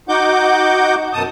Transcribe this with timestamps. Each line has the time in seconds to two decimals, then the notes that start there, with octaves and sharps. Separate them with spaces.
0.09 D#4 F#4 F#5 D6 G6
1.13 F#2 B2 A5 D#6